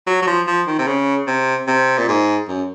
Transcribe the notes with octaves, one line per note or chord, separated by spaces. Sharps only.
F#3
F#3
F3
F3
D#3
C3
C#3
C3
C3
A#2
G#2
F#2